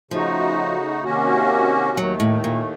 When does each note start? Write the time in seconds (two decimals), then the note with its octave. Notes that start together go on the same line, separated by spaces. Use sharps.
0.11 C#3 F3 A3 D#4 F#4
1.04 C3 D#3 A#3 C#4 F#4
1.97 D#2 D#3 F#3 A3
2.20 A2
2.44 A#2